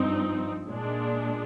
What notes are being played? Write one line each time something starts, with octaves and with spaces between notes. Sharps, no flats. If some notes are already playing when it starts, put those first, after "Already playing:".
Already playing: G2 F3 C4 D#4
A#2 G#3 D4